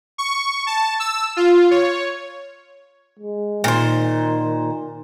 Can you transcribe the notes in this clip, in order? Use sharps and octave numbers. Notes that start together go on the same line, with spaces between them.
C#6
A5
E6
F4
C#5
G#3
A#2 D#3 C5